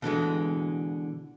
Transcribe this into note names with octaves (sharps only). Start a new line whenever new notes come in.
B2 D3 E3 G#3